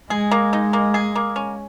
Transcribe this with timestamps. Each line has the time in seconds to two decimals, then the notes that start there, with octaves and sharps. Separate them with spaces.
0.10 G#3 G#4
0.31 A#3
0.53 D#4
0.73 A#3
0.94 G#4
1.15 A#3
1.36 C#4